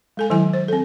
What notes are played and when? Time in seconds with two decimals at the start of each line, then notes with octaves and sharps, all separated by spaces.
0.17 G#3 A4 G#5
0.30 D#3 F#3 E4 G#5
0.54 C5
0.68 C4 A4